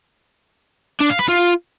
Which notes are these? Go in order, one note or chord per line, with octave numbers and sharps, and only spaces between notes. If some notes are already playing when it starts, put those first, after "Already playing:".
D4
F5
B4
F4